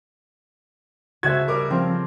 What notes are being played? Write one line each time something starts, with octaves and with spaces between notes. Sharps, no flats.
C#3 F#4 A4 C5 E5 G#6
G3 A#4 D6
F3 C4